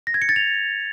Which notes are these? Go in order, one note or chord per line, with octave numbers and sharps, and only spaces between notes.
A#6
G#6
C#7
A6
F7